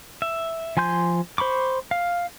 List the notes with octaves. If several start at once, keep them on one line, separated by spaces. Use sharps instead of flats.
E5
F3 G#5 C6 G6
C5 B5 C#6 D6
F5